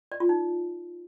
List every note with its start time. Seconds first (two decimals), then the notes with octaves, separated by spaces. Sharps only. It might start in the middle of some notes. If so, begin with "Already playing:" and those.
0.12 D5
0.20 F4
0.29 D#4